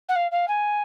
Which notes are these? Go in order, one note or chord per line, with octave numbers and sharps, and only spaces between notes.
F#5
F5
F5
G#5